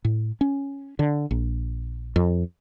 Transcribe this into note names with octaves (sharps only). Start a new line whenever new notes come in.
A2
C#4
D3
A#1
F2